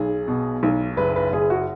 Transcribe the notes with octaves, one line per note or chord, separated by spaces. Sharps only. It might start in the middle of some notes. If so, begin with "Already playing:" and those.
Already playing: B1 G#4
B2
B1
F#1 B4
B4
F#1 G#4
F#4